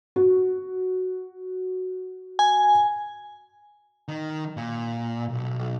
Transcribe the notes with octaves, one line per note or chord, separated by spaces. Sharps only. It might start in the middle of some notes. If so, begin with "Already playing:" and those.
F#4
G#5
D#3
A#2
B1